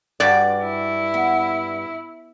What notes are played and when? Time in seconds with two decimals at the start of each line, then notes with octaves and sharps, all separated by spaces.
0.20 G2 F#4 B4 D5
0.64 E4
1.14 B3